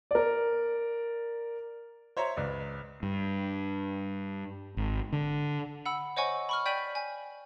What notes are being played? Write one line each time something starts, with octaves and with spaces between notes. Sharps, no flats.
A#4 D5
C5 C#5 E5 A#5
C#2 B4 D5
G2
G#1
D3
F#5 B5 E6
C5 C#5 D#5 F#5 G#5 C#6
B5 C#6 F6
D5 G5 G6 B6 D#7 F#7
G#5